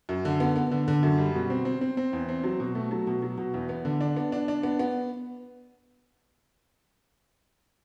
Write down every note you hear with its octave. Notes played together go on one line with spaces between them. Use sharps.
F#2
D3
B3
B3
D3
D3
F#2
G3
B2
C4
C4
C4
C4
E2
C4
F#3
B2
A3
F#3
B2
F#3
B2
E2
B3
D3
D4
B3
D4
D4
B3
B3